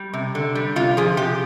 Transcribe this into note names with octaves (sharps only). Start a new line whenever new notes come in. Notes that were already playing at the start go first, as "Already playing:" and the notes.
Already playing: G3 G4
C3
D3
G3
C3 F4
F3 G#4
C3 G4